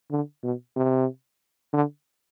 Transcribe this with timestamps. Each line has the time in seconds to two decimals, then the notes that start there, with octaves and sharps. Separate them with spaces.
0.11 D3
0.43 B2
0.76 C3
1.73 D3